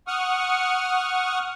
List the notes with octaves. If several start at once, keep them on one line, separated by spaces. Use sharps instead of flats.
F#5 C#6 D#6 F6